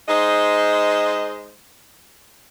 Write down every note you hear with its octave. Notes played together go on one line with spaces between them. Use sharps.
G#3 D#4 C5 D#5